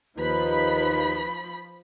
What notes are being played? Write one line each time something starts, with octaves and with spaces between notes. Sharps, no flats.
D#2 F3 D#4 B4 B5